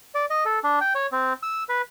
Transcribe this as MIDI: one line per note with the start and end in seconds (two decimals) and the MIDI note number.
0.15 0.26 74
0.30 0.44 75
0.45 0.59 69
0.64 0.79 62
0.81 0.93 79
0.95 1.07 73
1.12 1.33 60
1.43 1.63 88
1.69 1.82 71